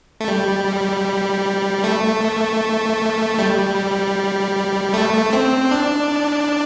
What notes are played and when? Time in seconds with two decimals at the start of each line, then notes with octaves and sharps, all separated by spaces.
0.20 A3
0.28 G3
1.84 A3
3.38 G3
4.94 A3
5.33 C4
5.71 D4